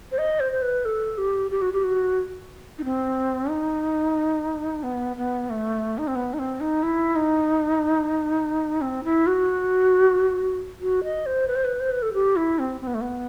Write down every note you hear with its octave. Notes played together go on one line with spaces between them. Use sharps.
C5
D#5
C5
C5
B4
A4
G4
G4
F#4
G4
F#4
D#4
C4
D#4
B3
B3
A3
D#4
C4
B3
D#4
C4
D#4
E4
D#4
C4
E4
F#4
F#4
D#5
C5
B4
C5
B4
C5
B4
A4
G4
E4
C4
C4
B3
A3
B3